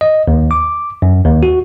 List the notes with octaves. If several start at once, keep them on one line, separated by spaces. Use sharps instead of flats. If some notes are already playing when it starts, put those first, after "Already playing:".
D#5
D#2
D6
F#2
D#2
F#4